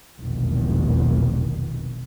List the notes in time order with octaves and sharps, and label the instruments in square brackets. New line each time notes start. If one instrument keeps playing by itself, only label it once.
[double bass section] F1 B1 E2 A#2 D#3